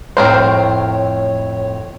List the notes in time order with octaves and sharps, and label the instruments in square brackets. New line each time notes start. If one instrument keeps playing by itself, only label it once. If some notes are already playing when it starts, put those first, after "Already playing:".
[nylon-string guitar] F2 A2 A3 [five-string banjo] C4 A#4 C5 [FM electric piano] C#5